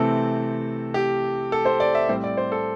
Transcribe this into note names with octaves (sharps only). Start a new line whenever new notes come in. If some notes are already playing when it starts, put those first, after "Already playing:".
Already playing: C3 E3 A3 C4 A4
G4
A4
C5
D5
E5
A2 G3 C4 C5
D5
C5
A4